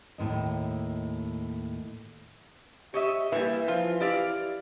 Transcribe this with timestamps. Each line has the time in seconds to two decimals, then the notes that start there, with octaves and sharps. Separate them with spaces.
0.18 D#2 A2 C3 D#5
2.94 G4 C#5 D#5 E5
3.32 E3 G3 A#3 E5
3.68 F3 F4
4.00 E4 G4 D5 F5